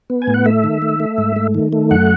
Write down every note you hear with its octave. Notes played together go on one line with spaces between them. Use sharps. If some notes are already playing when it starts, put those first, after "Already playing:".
B3
G#5
A2
F#5
A3 E5
D#3
A3
A3
G#2
A3
D#3
A3
F#2 F#5